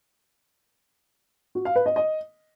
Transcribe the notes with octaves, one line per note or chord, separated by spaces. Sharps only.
F#4
F5
B4
D#5
D#5